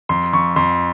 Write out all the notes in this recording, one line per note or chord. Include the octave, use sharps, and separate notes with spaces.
F2 C6
F2 C#6
F2 C6